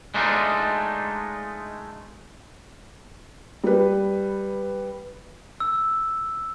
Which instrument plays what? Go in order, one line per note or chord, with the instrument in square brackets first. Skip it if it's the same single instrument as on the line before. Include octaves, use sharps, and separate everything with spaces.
[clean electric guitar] G#3 A3 D4 D#4 F4
[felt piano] G3 B4
[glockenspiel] E6